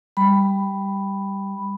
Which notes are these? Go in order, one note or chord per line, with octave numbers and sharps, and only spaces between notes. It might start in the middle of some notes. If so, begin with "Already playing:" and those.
G3 B5